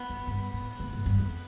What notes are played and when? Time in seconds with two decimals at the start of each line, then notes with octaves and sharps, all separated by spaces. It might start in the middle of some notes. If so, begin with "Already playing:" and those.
Already playing: B3
0.10 F#2
0.27 G2
0.54 A2
0.80 G#2
0.93 G#2
1.06 G2
1.20 F2